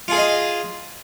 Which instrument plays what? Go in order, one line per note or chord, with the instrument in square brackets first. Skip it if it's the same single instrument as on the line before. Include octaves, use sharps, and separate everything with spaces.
[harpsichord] F4
G#4
F5
D#5